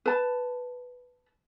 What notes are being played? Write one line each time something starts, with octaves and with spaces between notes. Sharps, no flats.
B4 A5